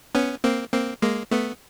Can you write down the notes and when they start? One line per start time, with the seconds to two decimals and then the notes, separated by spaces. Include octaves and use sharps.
0.15 B3 C#4
0.44 A#3 C4
0.73 A#3 C4
1.02 G#3 A#3
1.31 A3 B3